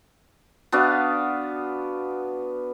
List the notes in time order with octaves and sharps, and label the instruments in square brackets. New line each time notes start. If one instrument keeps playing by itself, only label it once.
[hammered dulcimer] B3 D4 F#4 F5